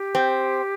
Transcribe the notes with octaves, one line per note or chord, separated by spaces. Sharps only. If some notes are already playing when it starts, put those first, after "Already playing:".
Already playing: G4
C4